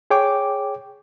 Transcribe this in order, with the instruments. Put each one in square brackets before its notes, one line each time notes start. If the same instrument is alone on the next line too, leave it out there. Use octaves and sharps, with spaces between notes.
[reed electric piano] G#4 C#5 G5 D6